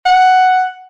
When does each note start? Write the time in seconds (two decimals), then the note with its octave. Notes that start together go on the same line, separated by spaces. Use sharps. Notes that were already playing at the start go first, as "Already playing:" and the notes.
0.05 F#5